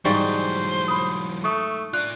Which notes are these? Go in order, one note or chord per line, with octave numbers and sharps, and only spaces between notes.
G#2 E3 F#3 G3 C5 C#6
B5 D#6
A3 C#6 D#6
D4 F4 D5 F#6